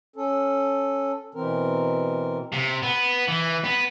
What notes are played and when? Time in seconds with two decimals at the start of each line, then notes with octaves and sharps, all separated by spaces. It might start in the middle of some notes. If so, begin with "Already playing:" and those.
0.16 C#4 A4
1.35 B2 E3 C4 A#4
2.52 C3
2.83 B3
3.28 E3
3.64 B3